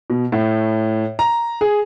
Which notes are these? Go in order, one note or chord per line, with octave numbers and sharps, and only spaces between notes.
B2
A2
A#5
G#4